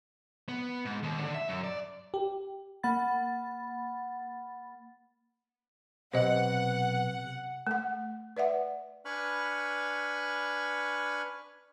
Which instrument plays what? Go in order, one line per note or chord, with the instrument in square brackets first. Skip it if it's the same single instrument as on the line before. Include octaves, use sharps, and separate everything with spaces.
[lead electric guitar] B3
G#2
D#2
D3
E5
F#2
D5
[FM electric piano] G4
A#3 F#5 B5 A6
[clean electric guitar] B1 B3 [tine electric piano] C3 [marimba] C5 D#5 [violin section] F#5
[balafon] A3 F#5
B4 D5 E5 F#5
[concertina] D4 B4 G#5 B5 C#6 F6